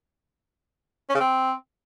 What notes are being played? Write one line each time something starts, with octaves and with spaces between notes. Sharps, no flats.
C#4
C#3
C4